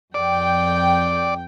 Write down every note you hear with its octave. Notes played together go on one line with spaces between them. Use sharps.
F2 D5 G5